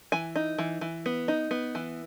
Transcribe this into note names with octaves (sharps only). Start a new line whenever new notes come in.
E3 G#5
D#4
E3
E3
B3
D#4
B3
E3